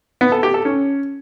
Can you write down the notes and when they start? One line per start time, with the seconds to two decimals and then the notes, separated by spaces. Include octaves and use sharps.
0.21 B3
0.32 A4
0.43 G4
0.54 A4
0.65 C#4